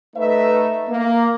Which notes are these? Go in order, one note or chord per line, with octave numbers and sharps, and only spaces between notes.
A3 D#4 B4 E5
A#3